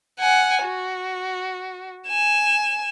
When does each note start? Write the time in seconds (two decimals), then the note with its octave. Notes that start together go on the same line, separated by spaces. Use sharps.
0.20 F#5 G#5
0.64 F#4
2.08 G#5 E7